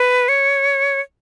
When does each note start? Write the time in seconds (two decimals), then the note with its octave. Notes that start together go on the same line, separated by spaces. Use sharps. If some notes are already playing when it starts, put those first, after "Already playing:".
Already playing: B4
0.29 C#5